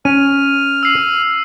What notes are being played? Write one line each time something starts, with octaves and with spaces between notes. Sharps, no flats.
C#4 F6 D#7
E6 C7